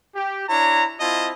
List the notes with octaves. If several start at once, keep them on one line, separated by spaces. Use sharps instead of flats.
G4
D4 E4 C#5 A#5
C4 E4 F4 D#5 A5